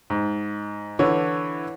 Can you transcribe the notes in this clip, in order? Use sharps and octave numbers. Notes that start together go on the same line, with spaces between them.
G#2
D3 E3 C#5